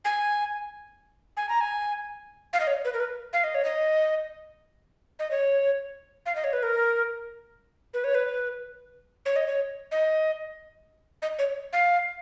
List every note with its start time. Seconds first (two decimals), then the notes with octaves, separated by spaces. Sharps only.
0.05 G#5
1.37 G#5
1.49 A#5
1.61 G#5
2.53 F5
2.60 D#5
2.67 C#5
2.85 B4
2.94 A#4
3.00 B4
3.33 F5
3.44 D#5
3.54 C#5
3.64 D#5
5.19 D#5
5.31 C#5
6.26 F5
6.35 D#5
6.44 C#5
6.53 B4
6.63 A#4
7.94 B4
8.04 C#5
8.14 B4
9.26 C#5
9.36 D#5
9.47 C#5
9.91 D#5
11.22 D#5
11.39 C#5
11.73 F5